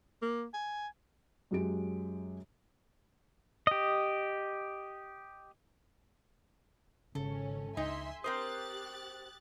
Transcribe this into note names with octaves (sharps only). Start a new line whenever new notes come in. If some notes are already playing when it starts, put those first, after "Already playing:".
A#3
G#5
F#2 F#3 G#3 G4 D7
G4 D#5
G#1 C#3 C#4 A4
C#2 D#4 E5 G#5 C6
C4 G4 A#4 C5 D#6 F#6 A6